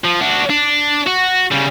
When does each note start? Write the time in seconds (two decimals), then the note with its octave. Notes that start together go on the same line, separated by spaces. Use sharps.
0.04 F3
0.21 D4 F#4
0.50 D4
1.07 F#4
1.51 C#3 G3